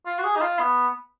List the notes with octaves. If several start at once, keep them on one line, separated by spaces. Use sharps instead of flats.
F4
F#4
G#4
D#4
F4
B3